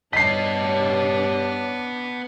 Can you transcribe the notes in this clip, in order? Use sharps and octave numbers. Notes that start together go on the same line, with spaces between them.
G2 B3 D4 C#5 D#5 B6 C7